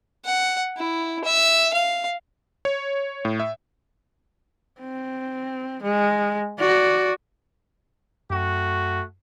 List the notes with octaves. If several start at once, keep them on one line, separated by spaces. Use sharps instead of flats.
F#5
E4
E5
F5
C#5
A2
E5
C4
G#3
F#4 D5
F#2 A3 F#4 G5